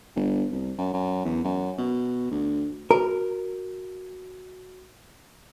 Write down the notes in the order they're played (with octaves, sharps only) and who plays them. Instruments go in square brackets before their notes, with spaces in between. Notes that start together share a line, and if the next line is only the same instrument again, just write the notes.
[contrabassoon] G1
C2
F#2
F#2
E2
F#2
B2
D2
[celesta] F#4 [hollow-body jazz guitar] A#4